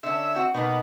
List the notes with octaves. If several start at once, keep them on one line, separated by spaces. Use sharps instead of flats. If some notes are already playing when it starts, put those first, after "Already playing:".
D3 C#4 E5
C4 F#4
B2 A#3 B3 D#4